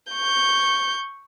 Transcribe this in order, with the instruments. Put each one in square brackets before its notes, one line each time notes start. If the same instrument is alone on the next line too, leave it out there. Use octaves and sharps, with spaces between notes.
[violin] C#6 G6